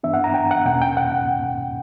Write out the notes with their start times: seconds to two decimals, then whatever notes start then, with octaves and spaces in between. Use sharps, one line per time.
0.03 G2 E3 B3 D4 E5
0.14 F#5
0.24 A#5
0.34 G5
0.51 F#5
0.66 E2 B2 A#3 C#4 G5
0.82 G5
0.97 F#5